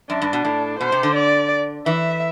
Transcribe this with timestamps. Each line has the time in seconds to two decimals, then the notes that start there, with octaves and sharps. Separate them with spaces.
0.10 F#2 D4
0.22 G2
0.33 B2
0.45 A2
0.80 B2 C5
0.92 C3
1.03 D3
1.16 D5
1.86 E3 E5